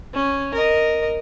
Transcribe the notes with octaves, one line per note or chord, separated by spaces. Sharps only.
C#4
A#4 D#5